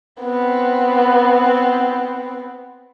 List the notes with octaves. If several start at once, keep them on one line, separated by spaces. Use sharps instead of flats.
B3 C4